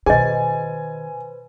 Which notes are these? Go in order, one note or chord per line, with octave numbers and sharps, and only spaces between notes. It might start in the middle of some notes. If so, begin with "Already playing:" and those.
B2 D#3 G#4 B4 C5 D#5 G#5